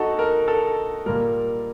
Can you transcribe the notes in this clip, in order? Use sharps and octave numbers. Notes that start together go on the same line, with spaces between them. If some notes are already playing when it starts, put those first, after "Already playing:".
Already playing: D#4 F#4 A4 D#5 F#5
A#4
A4
A#2 G3 A#4